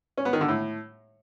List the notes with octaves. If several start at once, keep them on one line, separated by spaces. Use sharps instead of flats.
C#4
B3
D#3
D3
A2